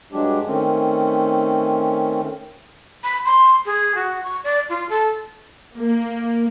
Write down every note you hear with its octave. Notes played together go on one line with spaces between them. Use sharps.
G2 F#3 G#3 D4 G4
D#3 A3 C4 C#4
B5
C6
G#4
F#4
C#6
D5
F4
A4
A#3